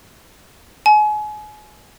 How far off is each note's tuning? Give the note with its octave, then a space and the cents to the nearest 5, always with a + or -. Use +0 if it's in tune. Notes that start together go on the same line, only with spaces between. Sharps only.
G#5 +35